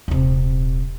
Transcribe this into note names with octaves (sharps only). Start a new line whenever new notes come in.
D#1 C3